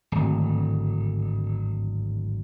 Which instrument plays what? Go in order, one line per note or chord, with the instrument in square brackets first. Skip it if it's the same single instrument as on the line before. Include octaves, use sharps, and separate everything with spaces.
[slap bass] D1 G#1